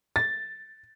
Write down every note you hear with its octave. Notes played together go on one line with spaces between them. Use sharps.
A6